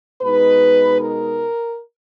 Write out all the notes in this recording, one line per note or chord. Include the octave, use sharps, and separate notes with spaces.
B2 G#3 D#4 B4
A#4